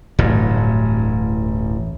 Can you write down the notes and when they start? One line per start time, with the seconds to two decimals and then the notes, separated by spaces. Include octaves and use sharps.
0.19 D1 A1 G2